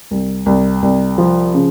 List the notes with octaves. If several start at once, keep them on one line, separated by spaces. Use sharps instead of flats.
C2
C2
C2
F3
C#3